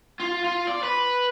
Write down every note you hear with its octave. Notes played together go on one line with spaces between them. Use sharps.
F4
F4
D5
B4